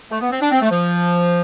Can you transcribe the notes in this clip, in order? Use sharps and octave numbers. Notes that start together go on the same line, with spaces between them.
A3
B3
C4
D4
C4
A3
F3